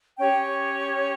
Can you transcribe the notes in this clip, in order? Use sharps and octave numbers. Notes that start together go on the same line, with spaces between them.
C#4 G4 C#5 G5